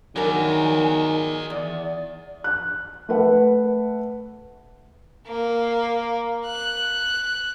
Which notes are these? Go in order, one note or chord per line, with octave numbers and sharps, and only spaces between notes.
D#3 F#3 G#4 A#4 D5 G#5
E2 D5
F#6
A3 B4 F#5
A#3
F#6